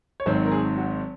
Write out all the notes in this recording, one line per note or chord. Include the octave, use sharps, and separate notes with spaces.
C#5
G#1 G#2 D#3 F#3 C4 C5
A#4
G#4
F#4